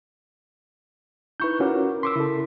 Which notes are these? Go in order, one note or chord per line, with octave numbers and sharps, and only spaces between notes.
D#4 E4 B4 C#6 G6
C#4 F4 F#4 A#4 D6
A#4 C6 D6 E6 B6
C#3 E4 A4